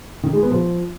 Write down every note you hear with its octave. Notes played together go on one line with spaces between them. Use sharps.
D#3
G#3
B3
F3